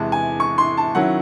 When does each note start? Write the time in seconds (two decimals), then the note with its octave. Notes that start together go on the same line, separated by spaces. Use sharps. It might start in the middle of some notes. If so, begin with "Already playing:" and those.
Already playing: E2 C3 E3 G#3 A5
0.12 G#5
0.40 C#6
0.58 C6
0.77 A5
0.95 D#3 F#3 C#4 E4 F#5